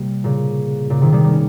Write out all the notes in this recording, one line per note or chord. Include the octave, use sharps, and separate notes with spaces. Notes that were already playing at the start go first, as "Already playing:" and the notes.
Already playing: C3 G3 A#3
A#2 C#3
A#2 C#3
C3 D#3
D#3 G3
G3 A#3
C#4